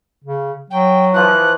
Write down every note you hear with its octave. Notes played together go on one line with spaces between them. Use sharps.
C#3
F#3 G5
E3 F3 F#6